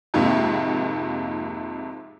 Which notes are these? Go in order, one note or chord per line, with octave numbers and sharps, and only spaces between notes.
F2 G#2 C3 D#3 A#3